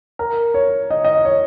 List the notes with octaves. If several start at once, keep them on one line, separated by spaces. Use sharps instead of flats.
A#4
C#5
D#5
D#5
C#5